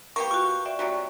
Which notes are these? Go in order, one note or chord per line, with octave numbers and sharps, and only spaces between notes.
A#3 B3 G4 C#6
F4 F#4 C#6
D5 E5 G5
C3 F#3 G3 F#4 D5